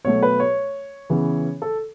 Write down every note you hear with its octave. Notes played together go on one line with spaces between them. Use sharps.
B2 F#3 A3 C#5
B4
C#5
C#3 E3 B3
A4